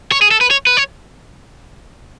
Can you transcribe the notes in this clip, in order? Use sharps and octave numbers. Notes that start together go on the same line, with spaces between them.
C#5
G#4
A4
B4
C#5
B4
C#5